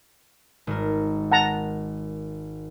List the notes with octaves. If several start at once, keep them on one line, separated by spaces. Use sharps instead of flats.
G#1 A#4
F#5 A5 A#5